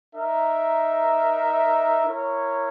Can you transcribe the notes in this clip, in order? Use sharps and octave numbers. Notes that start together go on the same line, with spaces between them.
D#4 A#4 E5
E4 A#4 C#5